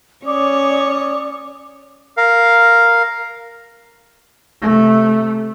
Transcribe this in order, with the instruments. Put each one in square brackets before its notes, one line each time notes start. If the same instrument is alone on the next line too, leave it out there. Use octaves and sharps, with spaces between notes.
[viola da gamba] C#4 C#5 [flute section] D5 D6 D#6
[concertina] A#4 F5
[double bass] C3 A3